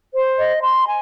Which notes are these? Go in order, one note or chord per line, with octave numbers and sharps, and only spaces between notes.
C5
D#5
C6
G#5